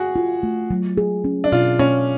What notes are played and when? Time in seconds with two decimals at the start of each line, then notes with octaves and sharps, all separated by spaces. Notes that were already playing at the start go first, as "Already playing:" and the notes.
Already playing: F#4 G#4
0.16 F4
0.43 A3
0.70 F#3
0.97 G#4
1.24 C#4
1.44 D4
1.52 B2 F4
1.79 B2 C#4